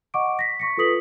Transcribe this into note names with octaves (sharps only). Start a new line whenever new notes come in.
D#5 F#5 C#6 D6 D7
A#6 B6
C#6 B6 C#7
F4 A4 B4 D#6 B6 F#7